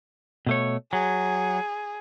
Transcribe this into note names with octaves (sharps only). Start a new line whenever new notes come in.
B2 A3 C#5
F#3 G#4